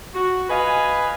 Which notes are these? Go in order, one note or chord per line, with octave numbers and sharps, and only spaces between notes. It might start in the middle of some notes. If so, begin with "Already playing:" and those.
F#4
B4 D#5 F5 G#5